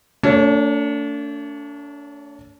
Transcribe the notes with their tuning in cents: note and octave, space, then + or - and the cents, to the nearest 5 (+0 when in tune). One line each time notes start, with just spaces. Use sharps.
A3 +35 D4 -35 C#5 +0